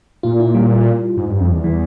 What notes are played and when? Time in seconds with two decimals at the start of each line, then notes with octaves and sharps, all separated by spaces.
0.23 A#2 F4
0.40 E4
0.55 G3
1.17 G#2
1.29 G2
1.40 F2
1.52 E2
1.64 E3